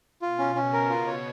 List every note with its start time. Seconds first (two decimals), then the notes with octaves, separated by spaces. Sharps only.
0.22 B2 F4
0.39 C#4
0.55 C#3 C#4
0.73 A#4
0.90 B2 F4
1.07 C#5